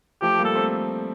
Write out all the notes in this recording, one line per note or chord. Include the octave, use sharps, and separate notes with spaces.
F3 A3 G4
G3 A#3
A4
A3 C4